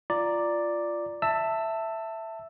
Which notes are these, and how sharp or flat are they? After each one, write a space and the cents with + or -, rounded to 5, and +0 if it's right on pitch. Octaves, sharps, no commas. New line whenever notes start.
F4 -15 D5 +0 A#5 +0
E5 +0 A5 +20 E6 +0